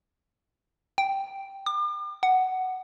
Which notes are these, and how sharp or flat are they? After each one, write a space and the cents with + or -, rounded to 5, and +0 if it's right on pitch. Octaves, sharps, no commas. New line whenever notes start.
G5 -5
D6 +40
F#5 +10